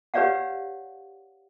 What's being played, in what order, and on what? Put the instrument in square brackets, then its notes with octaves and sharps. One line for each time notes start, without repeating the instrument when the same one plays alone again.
[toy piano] G4 B4 C#5 D5 F5 F#5